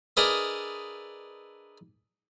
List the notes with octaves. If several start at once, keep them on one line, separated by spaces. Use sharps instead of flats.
D4 G#4 A#4 B4 D#5 E5